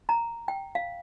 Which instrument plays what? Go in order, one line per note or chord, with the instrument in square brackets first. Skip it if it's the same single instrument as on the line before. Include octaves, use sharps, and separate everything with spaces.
[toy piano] A#5
G5
F5